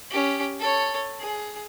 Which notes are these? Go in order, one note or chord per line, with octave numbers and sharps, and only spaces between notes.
C#4 G4
A4 C#5
G#4